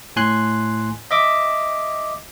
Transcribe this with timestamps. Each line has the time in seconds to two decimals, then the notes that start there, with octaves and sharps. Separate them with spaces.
0.16 A2 G#5 C6 F#6
1.11 D#5 E5 D6